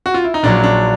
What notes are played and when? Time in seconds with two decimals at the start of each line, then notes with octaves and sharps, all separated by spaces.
0.06 F#4
0.14 F4
0.24 E4
0.34 D#4
0.43 A#1 A#2 F#3 D4
0.64 D4